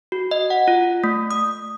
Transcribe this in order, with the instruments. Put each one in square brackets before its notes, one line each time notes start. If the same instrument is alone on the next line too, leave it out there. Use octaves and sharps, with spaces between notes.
[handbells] F#4
D#5
F#5
F4
A3
D#6